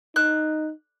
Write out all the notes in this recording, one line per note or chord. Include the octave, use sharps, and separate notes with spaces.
D#4 F#6